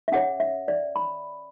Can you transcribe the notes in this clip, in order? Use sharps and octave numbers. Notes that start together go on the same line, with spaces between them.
E5
C#4 G#4 C#5 F#5
E5
D5
B5